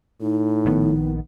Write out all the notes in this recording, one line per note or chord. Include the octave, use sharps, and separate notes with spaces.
A2 D#4
A#1 D#3 B3